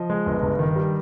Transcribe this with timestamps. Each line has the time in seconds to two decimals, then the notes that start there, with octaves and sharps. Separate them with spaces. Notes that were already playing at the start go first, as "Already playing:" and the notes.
Already playing: F3 D#5
0.10 G#3
0.26 G1
0.43 G2
0.59 D#3
0.76 G3